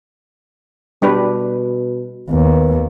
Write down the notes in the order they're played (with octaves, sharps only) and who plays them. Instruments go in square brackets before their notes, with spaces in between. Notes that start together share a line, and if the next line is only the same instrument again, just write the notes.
[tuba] B2 [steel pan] G3 D4 B4
[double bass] D#2 [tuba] B3